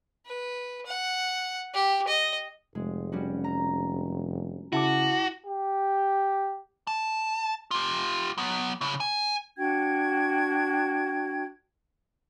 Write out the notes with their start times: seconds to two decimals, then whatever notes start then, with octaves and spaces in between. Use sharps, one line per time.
0.26 B4
0.86 F#5
1.74 G4
2.08 D#5
2.75 F1 G#3
3.12 G3 C#4 F#4
3.44 A#5
4.73 C#3 E4 F#4 A5 D6
5.46 G4
6.87 A5
7.71 F4 G4
8.38 F#3 B3
8.81 C#3 E4
9.00 G#5
9.57 D4 F#4 G5 G#6